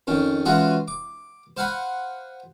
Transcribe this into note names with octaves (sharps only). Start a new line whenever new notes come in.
F2 D#3 C#4
E3 G#3 C#4 F4 F#4 G#4
D6
C5 F5 F#5 G#5 B5